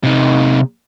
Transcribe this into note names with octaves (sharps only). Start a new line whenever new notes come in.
C3 D#4